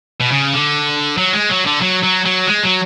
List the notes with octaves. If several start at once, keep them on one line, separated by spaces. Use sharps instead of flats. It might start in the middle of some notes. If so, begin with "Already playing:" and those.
B2
C#3
D3
F#3
G#3
F#3
D3
F#3
F#3
F#3
G#3
F#3